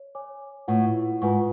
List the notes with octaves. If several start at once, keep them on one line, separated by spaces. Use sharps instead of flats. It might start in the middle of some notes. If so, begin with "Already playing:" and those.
Already playing: C#5
C#5 G#5 D6
A2 F4 B4 F#5 C#6
G#2 F4 B4 F#5 C#6